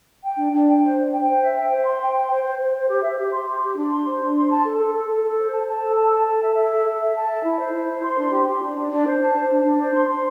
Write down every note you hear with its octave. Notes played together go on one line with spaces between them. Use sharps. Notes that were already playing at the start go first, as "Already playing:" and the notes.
G5
D4
D4
G5
C5
D4
G5
C5
E5
G5
C5
C6
G5
G5
C5
C5
C5
C5
G4
E5
G4
C6
G4
G4
D4
C6
C5
D4
C6
A5
A4
A4
A4
A4
A4
C5
A5
A5
A4
A5
A5
A4
E5
E5
A4
A4
E5
A5
E5
E4
C5
E4
C5
C6
D4
G4
G4
D4
D4
D4
C5
A5
C5
D4
D4
C5
C6
C6